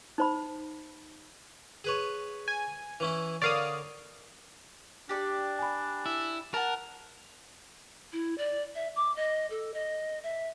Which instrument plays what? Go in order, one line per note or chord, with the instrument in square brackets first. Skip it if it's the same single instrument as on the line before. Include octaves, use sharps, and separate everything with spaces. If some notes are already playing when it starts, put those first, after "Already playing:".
[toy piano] D#4 C5 B5
[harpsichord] G#4 B4 C#5
[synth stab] G#5
[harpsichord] E3 C#4 E4
[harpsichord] D3 A#4 C#5 [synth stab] D5 F5 D#6
[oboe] D4 [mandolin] G4 D5 C#6
[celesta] G#5 B5
[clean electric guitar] E4
[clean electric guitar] A#4 [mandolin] F#5 A5
[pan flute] E4
D5
E5
D6
D#5
A4
D#5
E5